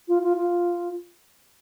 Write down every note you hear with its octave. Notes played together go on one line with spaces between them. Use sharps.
F4
F4
F4